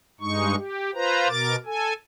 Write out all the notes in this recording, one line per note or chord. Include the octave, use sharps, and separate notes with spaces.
G2 G#3 D#4 C#6
G4
F4 B4 C5 A#5
B2 A#4 D6 A6
A4 G#5